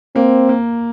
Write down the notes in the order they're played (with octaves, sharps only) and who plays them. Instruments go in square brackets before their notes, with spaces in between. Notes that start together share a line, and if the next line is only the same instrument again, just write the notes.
[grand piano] A#3 [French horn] C4
[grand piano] A#3